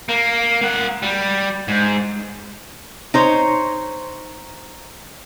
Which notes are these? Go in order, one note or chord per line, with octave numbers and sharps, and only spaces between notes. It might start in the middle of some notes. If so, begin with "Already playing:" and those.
A#3
A#3 F#5
G3
G#2
D#4 C5 C#5